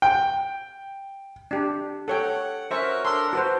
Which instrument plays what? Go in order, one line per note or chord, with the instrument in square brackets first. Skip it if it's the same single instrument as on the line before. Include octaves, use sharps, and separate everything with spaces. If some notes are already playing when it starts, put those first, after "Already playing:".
[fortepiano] G5
[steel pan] D4 G4
[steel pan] A4 C#5 G5 [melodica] F#5
[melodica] C#4 F#4 A#4 [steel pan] C5 E5 C#6
[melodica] D4 A4 A#4 [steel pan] C6
[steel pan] F#4 B4 C5 [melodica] A5